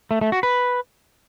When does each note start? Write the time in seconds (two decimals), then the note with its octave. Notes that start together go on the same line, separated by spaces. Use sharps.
0.11 A3
0.21 A3
0.32 F#4
0.43 B4